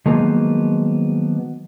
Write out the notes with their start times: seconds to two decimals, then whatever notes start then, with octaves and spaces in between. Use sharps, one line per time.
0.06 D#3 F3 F#3 G#3 A#3 B3